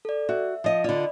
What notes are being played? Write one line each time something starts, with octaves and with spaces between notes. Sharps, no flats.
A4 D5
F#4 E5
F3 D#5
D3 F4 D5 D#5 B5